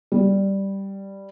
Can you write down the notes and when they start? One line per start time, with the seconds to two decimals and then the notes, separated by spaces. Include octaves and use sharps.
0.12 G3